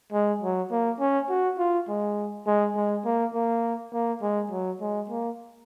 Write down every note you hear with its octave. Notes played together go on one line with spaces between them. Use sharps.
G#3
F#3
A#3
C#4
F#4
F4
G#3
G#3
G#3
A#3
A#3
A#3
G#3
F#3
G#3
A#3